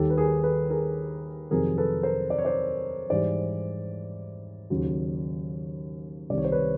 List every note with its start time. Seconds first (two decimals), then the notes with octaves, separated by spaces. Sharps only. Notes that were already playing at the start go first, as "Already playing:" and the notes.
Already playing: D#2 D#3 G3 G4 A4
0.10 B4
0.18 G#4 A#4
0.43 A4 B4
0.70 G#4 A#4
1.50 F2 C3 D#3 F#3 G#4 A#4
1.78 A4 B4
2.03 A#4 C5
2.30 D5
2.38 C#5
2.45 C5 D5
3.10 G#2 E3 G3 C5 D5
4.70 D#2 C#3 F#3
6.30 C2 C3 D#3 D5
6.38 C#5
6.44 C5
6.52 B4 C#5